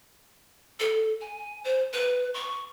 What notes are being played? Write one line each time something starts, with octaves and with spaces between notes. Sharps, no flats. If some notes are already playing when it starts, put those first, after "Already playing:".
A4
G#5
C5
B4
C#6